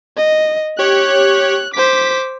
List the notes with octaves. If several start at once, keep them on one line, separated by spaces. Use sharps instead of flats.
D#5
G4 C#5 F#6
C5 D6 B6